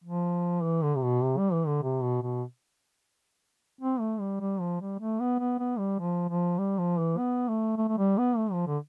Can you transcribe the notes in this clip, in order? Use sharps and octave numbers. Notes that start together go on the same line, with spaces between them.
F3
E3
D3
C3
B2
C3
G3
E3
D3
C3
B2
B2
C4
A3
G3
G3
F3
G3
A3
B3
B3
B3
G3
F3
F3
G3
F3
E3
B3
A3
A3
A3
G3
B3
A3
F3
D3